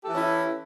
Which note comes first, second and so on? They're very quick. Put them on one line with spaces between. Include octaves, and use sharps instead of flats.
G4 A4 E3 C#4 E4